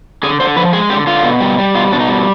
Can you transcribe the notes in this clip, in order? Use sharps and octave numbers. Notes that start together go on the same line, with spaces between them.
D3 G#4
D3 C5
F3 B4
G#3 G#4
D3 G4
D3 F4
B2
G3
G3
B2 F4
B2 D4
D#4
G3